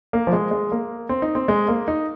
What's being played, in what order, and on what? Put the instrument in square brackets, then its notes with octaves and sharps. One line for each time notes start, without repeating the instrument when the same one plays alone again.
[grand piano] A#3
F3
G#3
G#3
A#3
C4
D#4
C4
G#3
A#3
D#4